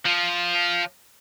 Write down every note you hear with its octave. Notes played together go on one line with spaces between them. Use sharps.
F3